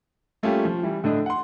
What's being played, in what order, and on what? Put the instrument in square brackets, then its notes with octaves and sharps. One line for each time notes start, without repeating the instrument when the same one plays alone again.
[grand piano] G3 A3 A#3 C#4 F4 G4
F3
E3 G3 E4
A2 D3 D4 D#5
F#5 C6